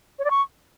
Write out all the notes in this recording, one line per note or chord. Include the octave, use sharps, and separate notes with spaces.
C#5
D5
C#6